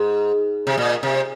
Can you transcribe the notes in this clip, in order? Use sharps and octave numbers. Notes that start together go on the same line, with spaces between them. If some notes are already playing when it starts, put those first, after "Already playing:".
Already playing: G#2
C3
A#2
C3